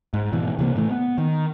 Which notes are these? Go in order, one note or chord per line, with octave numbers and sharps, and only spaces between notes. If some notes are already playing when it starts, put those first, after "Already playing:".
G#2
G#2 B2 E3
C3 E3 F#3 A#3
A2 E3 G3 A3
B3
D#3